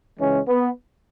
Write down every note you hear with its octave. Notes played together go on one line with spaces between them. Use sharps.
C#2 C#3 E3 G#3 C#4
B3